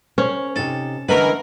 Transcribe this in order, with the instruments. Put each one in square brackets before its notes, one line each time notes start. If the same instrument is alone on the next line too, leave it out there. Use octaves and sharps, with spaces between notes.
[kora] C#4 [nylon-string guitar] A#4 C5
[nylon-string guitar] C3 D#4 [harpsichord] A4
[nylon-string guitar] D3 G#3 G#5 [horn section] E3 A#4 [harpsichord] B4 B5 C#6